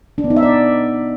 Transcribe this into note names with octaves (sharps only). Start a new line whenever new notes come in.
D4
B3
D#4
E5
D5